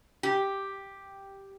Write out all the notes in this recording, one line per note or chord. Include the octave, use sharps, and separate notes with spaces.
G4